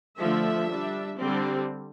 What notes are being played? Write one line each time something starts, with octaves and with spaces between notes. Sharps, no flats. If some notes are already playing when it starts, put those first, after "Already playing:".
D3 F3 A3 E5
G3 D4
D3 G3 C4